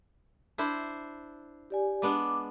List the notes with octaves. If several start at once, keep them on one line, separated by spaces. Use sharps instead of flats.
D4 E4 C5
G4 D5 G#5
G#3 B3 D4 D6